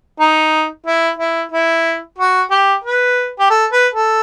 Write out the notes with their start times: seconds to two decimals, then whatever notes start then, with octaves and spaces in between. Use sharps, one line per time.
0.20 D#4
0.86 E4
1.19 E4
1.52 E4
2.18 F#4
2.51 G4
2.84 B4
3.40 G4
3.50 A4
3.72 B4
3.94 A4